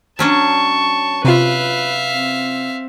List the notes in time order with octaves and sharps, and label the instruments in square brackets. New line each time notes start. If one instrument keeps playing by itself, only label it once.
[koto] F#3 C#4 D4 [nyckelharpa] A5 C#6
[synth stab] C3 F4 [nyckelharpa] B4 [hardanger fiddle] E5 F5
[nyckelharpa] C4